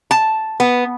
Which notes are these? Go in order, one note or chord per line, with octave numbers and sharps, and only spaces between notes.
A5
B3